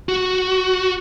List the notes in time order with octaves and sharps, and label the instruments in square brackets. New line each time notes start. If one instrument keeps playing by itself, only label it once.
[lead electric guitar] F#4